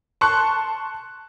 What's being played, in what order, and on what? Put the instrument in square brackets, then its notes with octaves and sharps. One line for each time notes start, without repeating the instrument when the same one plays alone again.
[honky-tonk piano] A5 C6 C#6 F#6